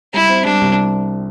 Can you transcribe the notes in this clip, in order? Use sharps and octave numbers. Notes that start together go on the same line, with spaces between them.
G3 E4
C4
G3 D4
C2